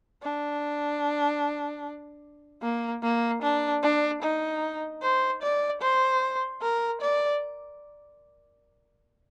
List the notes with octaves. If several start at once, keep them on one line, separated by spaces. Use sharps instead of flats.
D4
A#3
A#3
D4
D4
D#4
C5
D5
C5
A#4
D5